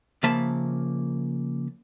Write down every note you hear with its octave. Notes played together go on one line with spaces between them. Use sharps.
C#3 F3 A#3 E5 A5 B5